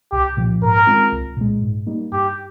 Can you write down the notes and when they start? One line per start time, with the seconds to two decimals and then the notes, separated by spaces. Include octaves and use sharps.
0.11 C2 G4
0.37 A#2 F3
0.62 G#2 A#4
0.87 D#3 G#3 C4 F4
1.12 C2
1.37 A#2 G#3
1.62 G#2
1.87 G3 A#3 D#4
2.12 G2 G4